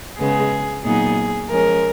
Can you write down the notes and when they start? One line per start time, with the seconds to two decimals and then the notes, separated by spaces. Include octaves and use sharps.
0.19 C#3 G#3 B3 G#4
0.85 A#2 F#3 B3 D#4 G#4
1.51 F3 G#3 C#4 A#4